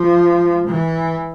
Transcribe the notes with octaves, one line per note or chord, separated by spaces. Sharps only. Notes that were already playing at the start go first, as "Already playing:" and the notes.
Already playing: F3
E3